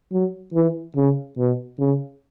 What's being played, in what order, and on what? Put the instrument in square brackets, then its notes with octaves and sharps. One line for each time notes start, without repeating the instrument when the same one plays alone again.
[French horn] F#3
E3
C#3
B2
C#3